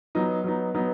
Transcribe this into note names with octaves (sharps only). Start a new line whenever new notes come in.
F#3 B3 D#4
F#3 B3 D#4
F#3 B3 D#4